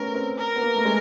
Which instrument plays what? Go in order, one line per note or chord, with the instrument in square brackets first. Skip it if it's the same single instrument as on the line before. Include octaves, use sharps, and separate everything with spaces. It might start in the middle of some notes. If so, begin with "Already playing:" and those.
Already playing: [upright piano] A3 B3 C#4 [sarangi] A#4
[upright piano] C4
[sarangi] A#4
[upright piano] B3
A#3
A3
G#3